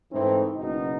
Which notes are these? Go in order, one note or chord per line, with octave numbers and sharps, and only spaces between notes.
G#2 E3 A3 C4 D#4
F#1 B2 D#4